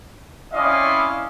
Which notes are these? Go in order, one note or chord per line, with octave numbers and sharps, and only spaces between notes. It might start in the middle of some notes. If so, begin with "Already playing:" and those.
C4 C#4 E4 D5 D#5 F5